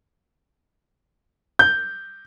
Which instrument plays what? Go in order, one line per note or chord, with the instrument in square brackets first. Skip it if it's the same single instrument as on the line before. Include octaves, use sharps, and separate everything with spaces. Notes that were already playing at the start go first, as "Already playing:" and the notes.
[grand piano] G6